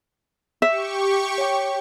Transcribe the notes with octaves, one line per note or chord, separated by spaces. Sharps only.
G4 E5 C#6
C#5 G5